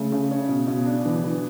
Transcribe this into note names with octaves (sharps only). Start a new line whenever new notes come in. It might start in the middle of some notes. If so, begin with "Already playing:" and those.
Already playing: C#3 A3
C#3
C#4
B2
B2
D4
E3
E3